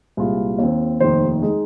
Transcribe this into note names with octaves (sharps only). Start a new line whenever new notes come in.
C2 A#2 G#3 F4
D#2 D#3 C4
F1 D#2 D#3 C5
G#3 D#4